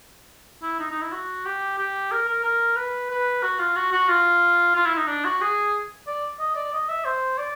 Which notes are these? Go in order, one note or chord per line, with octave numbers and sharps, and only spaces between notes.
E4
D#4
D#4
E4
F#4
G4
G4
A#4
A#4
A#4
B4
B4
F#4
F4
F#4
F#4
F4
F4
E4
D#4
D4
F#4
G#4
D5
D#5
D5
D#5
E5
C5
D5